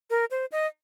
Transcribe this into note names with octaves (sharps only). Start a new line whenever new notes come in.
A#4
C5
D#5